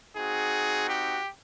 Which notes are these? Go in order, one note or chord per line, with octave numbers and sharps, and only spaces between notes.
C4 D#4 F#4 G#4
G4